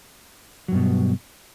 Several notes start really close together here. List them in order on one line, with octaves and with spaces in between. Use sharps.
F#3 G2 B2